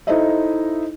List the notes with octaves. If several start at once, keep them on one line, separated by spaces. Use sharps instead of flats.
D#4 E4 A4 C5 D#5 E5